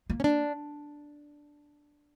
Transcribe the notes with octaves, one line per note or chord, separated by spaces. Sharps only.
A#3
C#4
D4